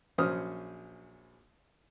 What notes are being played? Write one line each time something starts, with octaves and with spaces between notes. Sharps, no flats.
A#1 F#3 C#4 C5 D#6 F6